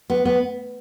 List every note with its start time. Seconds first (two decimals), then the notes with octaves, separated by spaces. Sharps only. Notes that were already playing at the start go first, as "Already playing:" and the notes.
0.10 B3
0.25 B3